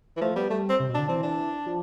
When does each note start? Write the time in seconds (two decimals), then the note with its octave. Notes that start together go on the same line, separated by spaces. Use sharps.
0.17 E3
0.21 F3 A3
0.36 G3 B3
0.50 G3 A3
0.69 C4
0.80 C3
0.89 B2
0.94 D3 D4
1.09 E3 C4
1.23 D4
1.67 F3